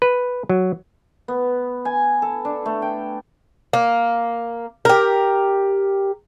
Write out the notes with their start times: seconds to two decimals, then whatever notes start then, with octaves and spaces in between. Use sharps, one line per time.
0.02 B4
0.49 F#3
1.28 B3
1.85 G#5
2.22 A4
2.45 D4
2.66 A3
2.82 G5
3.73 A#3
4.85 G4 A#4